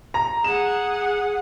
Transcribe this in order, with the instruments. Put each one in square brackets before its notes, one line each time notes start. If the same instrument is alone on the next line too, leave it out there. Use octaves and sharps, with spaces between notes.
[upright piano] A#5
[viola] G#4 F#5 [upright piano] E7